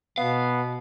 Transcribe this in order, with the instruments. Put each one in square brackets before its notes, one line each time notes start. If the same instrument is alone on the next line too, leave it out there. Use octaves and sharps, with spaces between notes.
[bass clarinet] B2 [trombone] B3 [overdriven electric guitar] F5